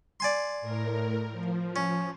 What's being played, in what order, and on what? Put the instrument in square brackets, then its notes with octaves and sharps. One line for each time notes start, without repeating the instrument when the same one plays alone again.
[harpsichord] D5 G#5 C6
[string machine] A2 A#4
F3
[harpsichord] C#4